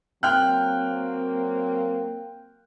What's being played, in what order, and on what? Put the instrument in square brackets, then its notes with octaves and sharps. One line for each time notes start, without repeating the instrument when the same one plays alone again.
[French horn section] F#3 A#3 C4 [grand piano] G5 F6 F#6